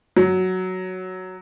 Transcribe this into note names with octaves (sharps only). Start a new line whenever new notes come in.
F#3